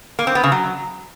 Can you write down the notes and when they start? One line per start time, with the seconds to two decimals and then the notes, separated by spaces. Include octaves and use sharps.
0.19 A#3
0.27 C4
0.35 B3
0.43 C#3
0.52 F#3